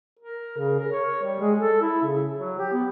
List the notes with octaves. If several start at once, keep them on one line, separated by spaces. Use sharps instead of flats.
A#4
C#3
A#4
C#5
G3
G#3
A4
E4
C#3
F#3
G4
B3